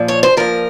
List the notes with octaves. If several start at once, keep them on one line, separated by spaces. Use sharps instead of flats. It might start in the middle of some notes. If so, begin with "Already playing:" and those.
Already playing: A#2 F3
C#5
C5
A#2 F3 A#4